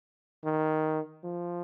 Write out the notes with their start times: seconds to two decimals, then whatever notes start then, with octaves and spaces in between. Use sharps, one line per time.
0.44 D#3
1.24 F3